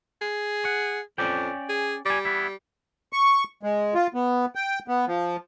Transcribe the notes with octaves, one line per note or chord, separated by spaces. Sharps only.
G#4
F#5
F2 C#4 D5 G5
G#4
G3 D5 G#5
B3 E4
C#6
G#3
F4
B3
G5
B3
F3